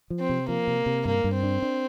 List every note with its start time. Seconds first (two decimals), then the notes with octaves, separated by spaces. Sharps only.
0.10 F3
0.20 C4
0.29 C3
0.48 F3 A#3
0.67 C3
0.86 C3
1.05 G2 A#3
1.24 G2
1.34 C4
1.43 D4
1.62 D4